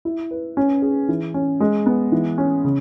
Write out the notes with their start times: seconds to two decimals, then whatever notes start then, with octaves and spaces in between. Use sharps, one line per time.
0.05 E4
0.31 B4
0.57 C#4
0.82 G#4
1.09 E3
1.34 C#4
1.60 G#3
1.86 B3
2.12 E3
2.38 C#4
2.64 C#3